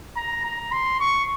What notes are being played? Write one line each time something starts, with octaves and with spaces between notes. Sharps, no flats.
A#5
A#5
C6
C#6